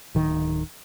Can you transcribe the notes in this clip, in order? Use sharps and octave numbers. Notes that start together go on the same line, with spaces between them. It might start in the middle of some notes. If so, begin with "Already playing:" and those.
D1 D#3